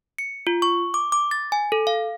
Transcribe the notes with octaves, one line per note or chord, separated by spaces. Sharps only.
C#7
F4
C#6
D6
D6
A6
G#5
A4
F5